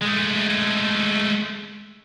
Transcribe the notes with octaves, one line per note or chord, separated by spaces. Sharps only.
G#3 A3